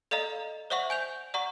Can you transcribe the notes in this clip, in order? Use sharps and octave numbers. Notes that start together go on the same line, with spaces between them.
A4 D5 D#5 F5 A#5
C5 D5 E5 F#5 C#6 F#7
G#5 G6 F7
D5 F#5 A#5 C#6